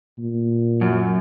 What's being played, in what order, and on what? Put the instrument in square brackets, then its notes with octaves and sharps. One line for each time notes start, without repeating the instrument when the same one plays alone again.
[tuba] A#2
[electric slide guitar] F#2